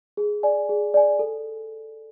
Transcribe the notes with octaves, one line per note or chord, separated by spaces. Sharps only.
G#4
D5 G#5
G#4
D5 G#5
A4